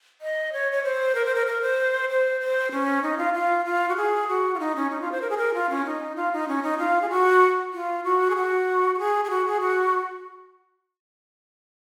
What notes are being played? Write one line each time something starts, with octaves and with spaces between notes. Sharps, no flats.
D#5
C#5
C#5
C5
A#4
C5
A#4
A#4
C5
C5
C5
C#4
D#4
F4
F4
F4
F#4
G#4
F#4
F4
D#4
C#4
D#4
F4
C5
A#4
G#4
A#4
F4
C#4
D#4
F4
D#4
C#4
D#4
F4
G#4
F#4
F4
F#4
G#4
F#4
F#4
G#4
G#4
F#4
G#4
F#4